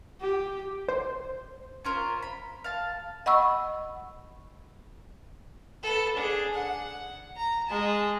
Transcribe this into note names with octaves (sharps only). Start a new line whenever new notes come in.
G4
C5
C#4 F4 A#4 C5
B5
F5 A5
D#5 F#5 B5 C#6 E6
A4 B4
D4 G#4
F#5
A#5
G#3 A5